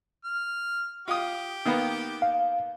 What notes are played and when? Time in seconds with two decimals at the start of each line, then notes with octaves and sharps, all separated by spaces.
0.25 F6
1.08 F4 G4 D#6
1.65 D#3 A#3 B3
2.22 F5